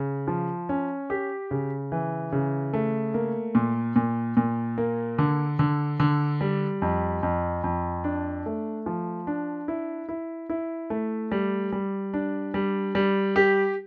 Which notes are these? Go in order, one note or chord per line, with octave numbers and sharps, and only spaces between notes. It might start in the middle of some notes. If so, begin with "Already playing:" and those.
Already playing: C#3
F3
C#4
G4
C#3
E3
C#3
A3
A#3
A#2
A#2
A#2
A#3
D3
D3
D3
G3
F2
F2
F2
D4
A3
F3
D4
E4
E4
E4
A3
G3
G3
D4
G3
G3
G4